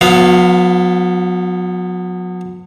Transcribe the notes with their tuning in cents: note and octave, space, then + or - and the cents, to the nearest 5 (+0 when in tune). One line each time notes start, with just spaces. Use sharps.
F#3 -45 B3 +0 F5 +0